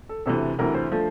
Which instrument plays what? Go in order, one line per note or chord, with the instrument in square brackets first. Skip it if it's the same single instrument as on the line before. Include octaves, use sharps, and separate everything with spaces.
[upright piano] A4
D2 C3 E3 A4
D2 C3 E3 A#4
C5
D3 F3 A3